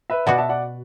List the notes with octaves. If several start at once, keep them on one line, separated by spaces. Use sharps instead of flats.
B4 E5
B2 B3 F#4 D5 F#5
E5 A5
D5 F#5